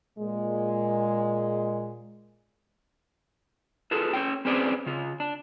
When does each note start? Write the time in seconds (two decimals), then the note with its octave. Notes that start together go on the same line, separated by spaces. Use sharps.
0.19 A#2 G#3
3.91 F4 G#4 A4 B4
4.13 C#4 C#5 G5
4.45 C4 C#4 G#4 B4 C5 D5
4.86 C#3 F4
5.20 D4